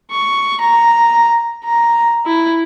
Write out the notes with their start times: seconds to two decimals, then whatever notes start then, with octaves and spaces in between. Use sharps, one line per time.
0.11 C#6
0.61 A#5
1.64 A#5
2.26 E4